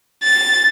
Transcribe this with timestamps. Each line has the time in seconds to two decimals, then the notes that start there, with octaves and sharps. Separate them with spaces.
0.24 A6